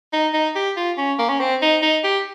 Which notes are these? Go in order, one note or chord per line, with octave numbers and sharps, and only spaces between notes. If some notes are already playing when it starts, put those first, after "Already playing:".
D#4
D#4
G4
F4
C#4
A#3
C#4
C4
D#4
D#4
G4